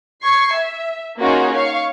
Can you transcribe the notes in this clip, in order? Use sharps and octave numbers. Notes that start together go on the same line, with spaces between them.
C#6 G#6 C7
E5
A#3 C#4 D#4 F4 F#4 G#4
C#5 F5 C#6